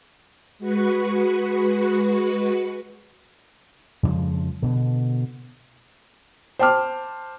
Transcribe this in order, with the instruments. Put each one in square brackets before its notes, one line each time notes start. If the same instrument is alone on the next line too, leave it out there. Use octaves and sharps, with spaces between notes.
[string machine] G#3 F#4 B4 C#6
[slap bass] F2 C#3 F3 G#3
B2 D3
[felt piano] C5 G5 A5 D6 F6